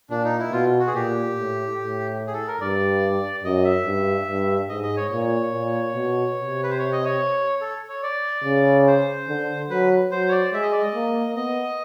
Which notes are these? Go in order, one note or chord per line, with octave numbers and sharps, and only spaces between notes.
A#2 D4
D#4
E4
B2 F4
F#4
G#4
A#2 G4
A2
A2
G#4
A4
A#4
G2 D5
F#2 D#5
E5
G2
G2
G#2 D#5
D#5
C#5
A#2 C#5
A#2
B2
C3
B4
C5
C#5
D#5
C#5
A4
C#5
D5
C#3
C5
D3
F#3 B4
F#3 C5
C#5
D5
G#3 E5
D#5
D5
D#5
A#3
B3 D#5